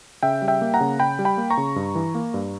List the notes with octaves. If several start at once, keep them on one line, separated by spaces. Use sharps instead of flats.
C#3 E5 G5
G3
E5 G5
A#3
F#5 A#5
C#3
C#3 G5 B5
G3
G5 B5
A#3
A#5 C#6
C#3
G2
E3
A#3
G2